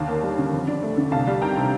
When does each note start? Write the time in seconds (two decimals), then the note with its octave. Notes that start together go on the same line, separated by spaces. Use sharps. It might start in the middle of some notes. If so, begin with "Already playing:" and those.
Already playing: D#2 D3 F5 A5
0.08 A#3
0.23 G3
0.38 D3
0.53 F2
0.67 D4
0.83 A3
0.97 D3
1.12 C2 F5 A5
1.27 G3
1.42 D#3 G5 A#5
1.57 C3